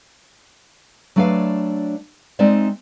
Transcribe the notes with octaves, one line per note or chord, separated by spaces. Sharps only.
F#3 A3 D4 B4 D5 F5
G#3 C4 D#4 C5 D5 E5